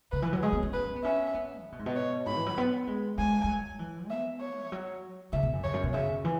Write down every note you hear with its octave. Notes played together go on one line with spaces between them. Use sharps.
C#3 B4
E3
F#3
G#3 G#4
B3
C#4
B4
B3
C#4 E5
B3
C#3
B2
G#2
B2
C#5
G#2 B5
E3
F#3
B3
G#3
G#3 G#5
G#3
F#3
E3
B3 E5
C#5
E3
F#3
C#3 E5
B2
F#2
E2 C#5
F#2
B2
C#3 E5
E3